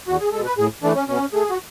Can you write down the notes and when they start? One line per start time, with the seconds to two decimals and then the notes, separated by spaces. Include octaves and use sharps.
0.08 E2 F#4
0.20 G#4
0.32 B2 G#3 A4
0.45 B4
0.58 A2 G#4
0.83 E3 A3 D4
0.95 C#4
1.08 B2 C#4
1.33 A3 G#4
1.50 F#4